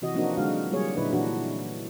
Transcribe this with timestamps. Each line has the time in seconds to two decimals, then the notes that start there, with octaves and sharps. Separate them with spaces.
0.02 C3 E3 F#4 D#5
0.14 F3 A#3 C4 D4 D#4 F#4
0.37 D3 F#3 G#3 F#4 F5
0.72 F#3 G3 A#3 G#4 C#5
0.97 A#2 D3 D#4 E4 B4
1.13 A#2 E3 D4 F#4